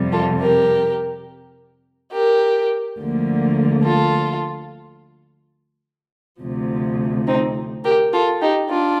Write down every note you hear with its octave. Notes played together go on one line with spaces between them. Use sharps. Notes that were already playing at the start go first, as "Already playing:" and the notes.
Already playing: F2 C3 G3
F4 A4
G4 A#4
G4 A#4
D2 D3 F3 A#3
F4 A4
D2 C3 F3
C4 D#4
G4 A#4
F4 A4
D#4 G4
D4 F4